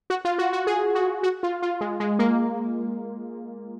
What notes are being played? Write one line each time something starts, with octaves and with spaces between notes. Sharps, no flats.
F#4
F4
F#4
F#4
G#4
F#4
F#4
F4
F4
G#3
G#3
A#3